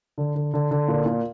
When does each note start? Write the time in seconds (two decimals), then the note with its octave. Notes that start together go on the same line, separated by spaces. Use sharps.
0.18 D3
0.35 D3
0.54 D3
0.71 D3
0.88 A#2
1.06 A#2